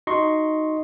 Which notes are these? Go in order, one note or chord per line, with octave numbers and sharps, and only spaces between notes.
D#4 F#4 D#5 C6 C#6